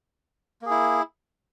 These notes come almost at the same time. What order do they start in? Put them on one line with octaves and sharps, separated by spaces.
A#3 G#4 E4